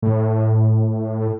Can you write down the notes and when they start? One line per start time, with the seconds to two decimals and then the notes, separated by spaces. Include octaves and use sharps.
0.02 A2